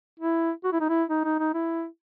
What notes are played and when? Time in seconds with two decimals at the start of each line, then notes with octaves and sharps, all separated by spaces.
0.19 E4
0.64 F#4
0.72 E4
0.80 D#4
0.89 E4
1.10 D#4
1.24 D#4
1.39 D#4
1.54 E4